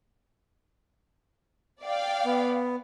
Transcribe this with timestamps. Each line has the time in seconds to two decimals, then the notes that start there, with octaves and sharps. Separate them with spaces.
1.83 D5 F5 G5
2.25 B3